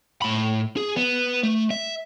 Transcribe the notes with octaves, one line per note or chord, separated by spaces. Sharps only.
A2 B5
G#4
B3
A3
E5